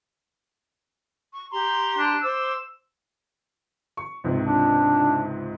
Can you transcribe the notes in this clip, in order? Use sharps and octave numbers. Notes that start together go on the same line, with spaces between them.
C#6
G4 A#5 C6
D4
C5 D6 E6
C#6
C#2 G#2 C3
D4